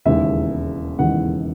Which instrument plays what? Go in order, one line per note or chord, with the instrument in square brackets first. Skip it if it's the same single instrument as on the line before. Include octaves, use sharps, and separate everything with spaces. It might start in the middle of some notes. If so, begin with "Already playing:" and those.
[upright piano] E1 D#2 C#3 E3 E5
E1 D#2 C#3 E3 F#5